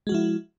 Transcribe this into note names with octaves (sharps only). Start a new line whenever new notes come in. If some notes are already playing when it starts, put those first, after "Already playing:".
F3 G#3 E4 F#4